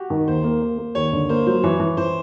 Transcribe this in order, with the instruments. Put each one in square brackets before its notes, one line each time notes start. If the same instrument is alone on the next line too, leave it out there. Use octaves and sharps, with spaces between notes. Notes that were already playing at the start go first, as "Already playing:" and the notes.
Already playing: [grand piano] F#4 G4
[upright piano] D#3
[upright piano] D#2 [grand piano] C5
[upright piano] A#3
A#3
A#3
[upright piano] D#2 [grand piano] C#5
[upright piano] D3
[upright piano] A#3 [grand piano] C5
[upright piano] F#3 [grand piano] C5
[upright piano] E3 [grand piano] C#5
[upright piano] E3
[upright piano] E3 [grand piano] C5